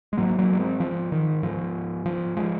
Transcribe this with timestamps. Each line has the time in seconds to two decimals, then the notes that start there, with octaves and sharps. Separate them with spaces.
0.13 G#3
0.17 G#2 F#3 A#3
0.39 F#3 A#3
0.53 A#3
0.59 G#3 C4
0.80 F3
1.12 D#3
1.43 G#2 F3
2.06 F3
2.37 F3 G#3